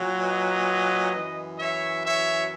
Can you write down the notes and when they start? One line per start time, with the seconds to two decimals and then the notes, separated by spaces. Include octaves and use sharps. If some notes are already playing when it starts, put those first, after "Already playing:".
Already playing: A#2 F#3
0.19 B4 D#5
1.12 F#2 E3
1.58 C#5 E5
2.03 C#5 E5